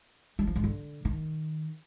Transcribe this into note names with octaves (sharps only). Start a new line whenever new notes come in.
G3
F3
G#2
D3
D#3